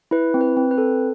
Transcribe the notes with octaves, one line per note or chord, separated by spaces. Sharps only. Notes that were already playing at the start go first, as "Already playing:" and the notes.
E4 B4
C4
B4
C4
B4
A4